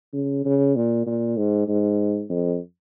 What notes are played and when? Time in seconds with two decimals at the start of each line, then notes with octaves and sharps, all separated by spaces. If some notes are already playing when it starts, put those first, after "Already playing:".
0.13 C#3
0.45 C#3
0.76 A#2
1.07 A#2
1.37 G#2
1.68 G#2
2.29 F2